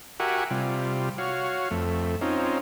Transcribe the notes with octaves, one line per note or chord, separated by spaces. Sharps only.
F#4 G4 A#4 E5 F#5 G#5
C3 G3 F4
F#4 C#5 F5
F2 A3
C4 C#4 D#4 F4